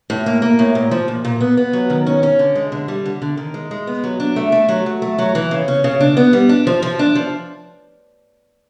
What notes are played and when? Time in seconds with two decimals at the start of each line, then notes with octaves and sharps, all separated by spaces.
0.10 A2
0.26 A#3
0.42 A#3
0.59 A2
0.75 A#2
0.91 F3
1.08 A#2
1.25 A#2
1.40 B3
1.57 B3
1.73 F#3
1.90 D#3
2.06 C#4
2.23 C#4
2.39 D3
2.55 G#3
2.72 D3
2.88 G3
3.06 D3
3.22 D3
3.37 D#3
3.54 G#3
3.71 G#3
3.87 B3
4.04 F#3
4.20 D4
4.36 A3
4.52 A3
4.69 F#3
4.86 F#3
5.02 A3
5.18 F#3
5.35 E3
5.51 C#3
5.68 C#4
5.84 C#3
6.00 D4
6.17 B3
6.33 G3
6.49 D4
6.67 F3
6.82 F3
6.99 D4
7.15 F3